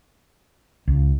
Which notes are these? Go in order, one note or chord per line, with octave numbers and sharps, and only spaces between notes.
C#2